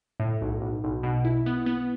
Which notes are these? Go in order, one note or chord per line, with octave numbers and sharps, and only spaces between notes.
A2
B1
B1
B1
B2
E4
B3
B3